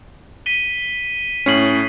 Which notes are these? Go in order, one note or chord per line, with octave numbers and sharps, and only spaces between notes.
B6 D#7 G7
A2 C#4 B6 C7 F#7